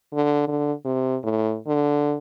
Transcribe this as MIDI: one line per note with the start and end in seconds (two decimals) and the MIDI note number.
0.13 0.43 50
0.48 0.73 50
0.85 1.17 48
1.23 1.57 45
1.67 2.16 50